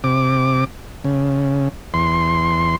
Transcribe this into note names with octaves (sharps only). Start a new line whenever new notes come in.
C3 D6
C#3
E2 C6